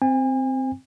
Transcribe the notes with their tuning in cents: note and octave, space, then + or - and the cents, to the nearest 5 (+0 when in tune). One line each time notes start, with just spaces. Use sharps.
C4 -5 G#5 -40